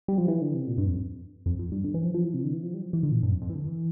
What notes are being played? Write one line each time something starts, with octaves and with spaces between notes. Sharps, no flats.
G3
F3
E3
D3
C3
A#2
G2
F2
F2
F2
G2
D3
E3
F3
F3
E3
C3
D3
E3
F3
G3
F3
E3
D3
A#2
G2
F2
F2
E3
D3
E3